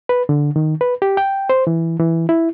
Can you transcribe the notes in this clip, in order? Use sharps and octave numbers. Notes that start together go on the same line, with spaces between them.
B4
D3
D#3
B4
G4
G5
C5
E3
E3
E4